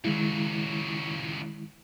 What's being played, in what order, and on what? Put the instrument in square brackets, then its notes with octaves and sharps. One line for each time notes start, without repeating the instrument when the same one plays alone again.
[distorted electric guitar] C#2 F#3 [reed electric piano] D#3 G#3 E4